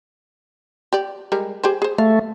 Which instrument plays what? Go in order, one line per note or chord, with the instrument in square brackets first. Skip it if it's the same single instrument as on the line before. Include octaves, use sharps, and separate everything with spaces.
[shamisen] G4 D5
G3 G#3 A#4
G4 G#4 C5
G#4 C5
[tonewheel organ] A3 [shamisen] F5